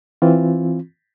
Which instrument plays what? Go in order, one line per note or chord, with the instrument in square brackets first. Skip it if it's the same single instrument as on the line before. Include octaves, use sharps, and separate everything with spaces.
[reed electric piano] E3 C4 F4